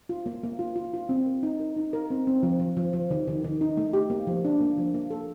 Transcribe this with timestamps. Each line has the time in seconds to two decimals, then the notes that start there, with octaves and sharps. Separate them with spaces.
0.09 F4
0.26 A#3
0.43 A#3
0.59 F4
0.76 F4
0.94 F4
1.09 C4
1.26 A#4
1.43 D#4
1.60 A#4
1.77 D#4
1.93 A#4
2.10 C4
2.27 C4
2.43 F3
2.60 F3
2.77 F3
2.93 F3
3.11 D#3
3.28 D#3
3.44 D#3
3.61 D#4
3.77 A3
3.93 G4
4.10 A#3
4.27 F3
4.45 D4
4.61 A#3
4.78 F3
4.94 A#3
5.11 A4